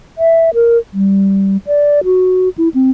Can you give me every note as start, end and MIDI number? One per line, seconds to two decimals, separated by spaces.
0.18 0.54 76
0.54 0.78 70
0.93 1.57 55
1.67 2.04 74
2.04 2.49 66
2.58 2.69 64
2.74 2.90 60